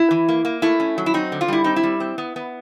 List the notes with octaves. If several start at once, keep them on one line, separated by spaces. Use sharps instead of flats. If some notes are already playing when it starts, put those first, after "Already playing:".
Already playing: E4
E3
A#3
A#3
A3 E4
C#4
F#3
E4
C4 D#4
D3
F4
G3 E4
C4 D#4
E4
G3
C4
B3
B3